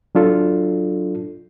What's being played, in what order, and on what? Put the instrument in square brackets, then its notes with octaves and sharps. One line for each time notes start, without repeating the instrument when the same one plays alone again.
[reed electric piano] F#3 D4 F4 A4